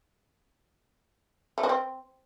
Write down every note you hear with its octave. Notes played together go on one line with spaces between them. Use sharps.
A3
F#4
C4